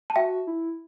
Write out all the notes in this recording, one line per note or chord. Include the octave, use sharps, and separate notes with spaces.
A5
F#4 E5 G5
E4